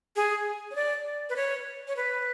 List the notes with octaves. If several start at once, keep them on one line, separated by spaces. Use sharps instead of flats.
G#4
C#5
D5
B4
C#5
C#5
B4